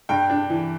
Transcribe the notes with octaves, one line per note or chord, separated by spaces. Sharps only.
G2 G5
D4
E3